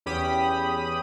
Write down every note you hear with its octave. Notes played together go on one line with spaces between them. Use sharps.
E2 C#4 G4 B5 D#6